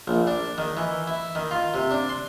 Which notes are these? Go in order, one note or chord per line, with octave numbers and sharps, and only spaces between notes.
A#1
D4
D#3
E3
E4
D#3
F4
C3
D4
C6